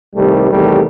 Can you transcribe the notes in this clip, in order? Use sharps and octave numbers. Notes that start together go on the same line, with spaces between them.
C2 C3 D#3 G3 A3
E2 C3 D#3 G3 A3